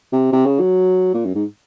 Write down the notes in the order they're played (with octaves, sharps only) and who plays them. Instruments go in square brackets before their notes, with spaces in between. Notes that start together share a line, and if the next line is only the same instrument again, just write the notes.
[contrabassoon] C3
C3
C#3
F#3
A#2
F#2
G#2